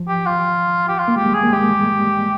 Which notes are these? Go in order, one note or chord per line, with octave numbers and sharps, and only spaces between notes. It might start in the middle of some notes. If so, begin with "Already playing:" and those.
Already playing: F3
G4
F4
G4
F4
A#3
G#3 G4
G3
G#4
A#3
G#3 G4
G3
G#3